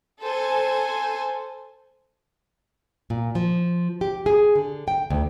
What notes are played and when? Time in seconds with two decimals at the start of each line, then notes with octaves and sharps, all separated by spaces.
0.21 A4 C5 G#5
3.10 A#2
3.35 F3
4.01 G4
4.26 G#4
4.55 D3
4.88 G5
5.10 D2